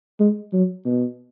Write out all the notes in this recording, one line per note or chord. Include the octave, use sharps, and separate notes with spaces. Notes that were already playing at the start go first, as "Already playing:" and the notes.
G#3
F#3
B2